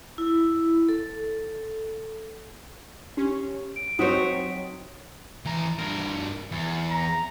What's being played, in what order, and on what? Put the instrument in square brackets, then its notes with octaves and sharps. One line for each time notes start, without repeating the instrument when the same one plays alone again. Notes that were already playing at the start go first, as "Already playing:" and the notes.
[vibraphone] E4
A4
[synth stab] C#4 [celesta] G4
[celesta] D7
[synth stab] F#3 C4 D#4 [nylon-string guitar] F#4 C#5 [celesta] D#6 B6 D7
[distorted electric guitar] E3 A#5
G2 A#4
E2
[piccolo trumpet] A#5